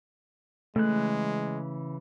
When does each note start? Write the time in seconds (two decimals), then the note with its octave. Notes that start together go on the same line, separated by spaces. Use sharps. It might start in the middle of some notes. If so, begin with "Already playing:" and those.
0.76 C#3 E3 G#3 A3 F#6